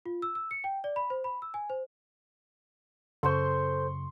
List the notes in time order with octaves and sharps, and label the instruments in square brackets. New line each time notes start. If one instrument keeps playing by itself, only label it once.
[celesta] F4
E6
E6
C#7
G5
D5
B5
C5
B5
E6
G#5
C5
[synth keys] F#2 C#3 [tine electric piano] A4 C5 [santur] C6 C#6